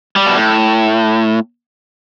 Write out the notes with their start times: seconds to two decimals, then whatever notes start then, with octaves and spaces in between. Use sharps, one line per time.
0.16 G3
0.26 B2
0.36 A2